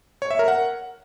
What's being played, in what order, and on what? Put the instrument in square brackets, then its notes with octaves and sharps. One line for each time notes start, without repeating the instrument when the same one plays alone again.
[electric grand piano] C#5
E5
A#4
F#5